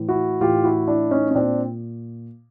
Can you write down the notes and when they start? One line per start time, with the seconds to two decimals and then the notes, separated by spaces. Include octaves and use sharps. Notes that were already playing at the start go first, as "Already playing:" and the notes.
Already playing: A2 E3
0.09 E4 F#4
0.41 A2 E3 F4 G4
0.64 E4 F#4
0.87 D4 E4
1.11 C#4 D#4
1.31 C#4
1.35 A#2 C4 D4